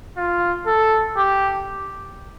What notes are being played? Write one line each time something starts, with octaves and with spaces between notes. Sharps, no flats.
F4
A4
G4